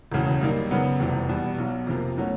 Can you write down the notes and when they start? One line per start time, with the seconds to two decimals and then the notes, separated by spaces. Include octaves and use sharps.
0.12 E1 D2 C#3 E3
0.41 F#2 D#3 G3 A#3 D#4
0.71 F#2 C#3 F#3 B3
1.00 F1 E2 C3 E3 G3
1.29 E2 B2 G3
1.58 B1 B2 F#3
1.87 F2 C3 F3 A#3
2.17 B2 F#3 A3 C#4